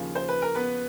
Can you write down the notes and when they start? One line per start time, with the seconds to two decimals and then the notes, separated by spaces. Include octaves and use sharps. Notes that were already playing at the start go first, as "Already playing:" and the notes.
Already playing: D#2 C#3 F3
0.15 C5
0.28 B4
0.42 A#4
0.55 B3 B4